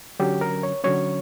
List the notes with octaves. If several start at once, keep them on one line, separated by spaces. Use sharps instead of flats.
D3 F#3 C#4 G4
A#4
C#5
D3 F#3 C#4 C#5